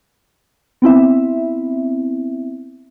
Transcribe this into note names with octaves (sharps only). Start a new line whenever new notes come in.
B3 C4 E4 E5